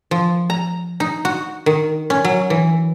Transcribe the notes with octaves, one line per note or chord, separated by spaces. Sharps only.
F3
A#5
D#4
F#4
D#3
C#4
F#3
E3